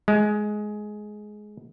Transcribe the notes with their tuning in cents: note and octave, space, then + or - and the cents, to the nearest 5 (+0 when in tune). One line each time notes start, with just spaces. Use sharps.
G#3 +15